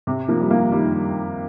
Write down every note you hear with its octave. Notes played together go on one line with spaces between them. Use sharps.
C3
F3 A#3
G3
F3 A#3
D#3 G3